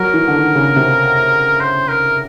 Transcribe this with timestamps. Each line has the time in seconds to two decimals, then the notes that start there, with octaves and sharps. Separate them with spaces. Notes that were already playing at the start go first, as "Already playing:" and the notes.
Already playing: F#3 A#4
0.14 E3
0.28 D3
0.34 D#3
0.55 C#3
0.76 C3
1.60 C5
1.88 A#4